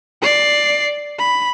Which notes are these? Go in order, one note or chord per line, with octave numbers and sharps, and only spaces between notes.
D5 C7
B5